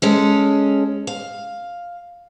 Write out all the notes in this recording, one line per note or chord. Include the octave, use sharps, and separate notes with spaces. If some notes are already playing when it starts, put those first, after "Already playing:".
G#3 C#4 A4
F5